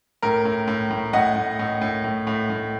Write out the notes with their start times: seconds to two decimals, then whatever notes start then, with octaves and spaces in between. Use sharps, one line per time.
0.22 A2 A#4
0.45 A2
0.67 A2
0.90 A2
1.13 A2 D#5 F#5
1.35 A2
1.59 A2
1.81 A2
2.04 A2
2.27 A2
2.50 A2